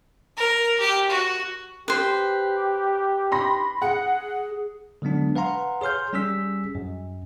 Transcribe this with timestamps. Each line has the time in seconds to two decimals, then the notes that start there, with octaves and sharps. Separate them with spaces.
0.37 A#4
0.80 G4
1.10 F#4
1.88 G4 B4 C5
3.32 B5 C6 A#6
3.82 G#4 F#5
5.02 D3 F#3 G#3 B3 D4
5.36 B4 F5 F#5 A#5 C6
5.81 G#4 C#5 C6 F6 G6
6.13 G3 C#4 G#4 E6 B6
6.75 F#2